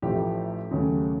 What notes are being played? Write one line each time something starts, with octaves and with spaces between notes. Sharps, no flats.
A1 A2 F3 A3 G4
D#2 C#3 F#3 A3